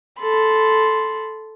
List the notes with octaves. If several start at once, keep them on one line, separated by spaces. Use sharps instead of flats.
A4 B5 C6